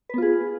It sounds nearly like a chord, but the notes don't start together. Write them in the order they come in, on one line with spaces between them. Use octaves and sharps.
B4 B3 F4 G#4